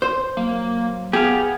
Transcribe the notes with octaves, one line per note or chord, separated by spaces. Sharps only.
C5
F#3 A#3
B3 G4 G#4 F5